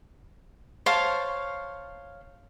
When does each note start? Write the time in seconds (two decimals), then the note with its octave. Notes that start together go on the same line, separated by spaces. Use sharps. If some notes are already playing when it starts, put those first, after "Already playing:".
0.86 C5 C#5 F5 A5